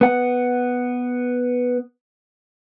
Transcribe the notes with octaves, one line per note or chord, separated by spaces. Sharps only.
B3 F#5